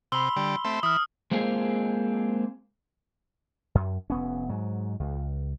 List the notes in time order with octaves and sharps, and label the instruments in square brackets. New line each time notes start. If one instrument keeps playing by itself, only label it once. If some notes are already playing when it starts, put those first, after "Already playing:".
[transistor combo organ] C3 [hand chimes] B5 C6 [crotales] E6 G7
[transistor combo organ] D3 G3
A3 C4 E5
[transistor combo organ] E3 [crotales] D#6 F6
[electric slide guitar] G#3 A#3 C4 F4 G#4
[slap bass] F#2
F1 B3 C#4
G#2 F#3
C#2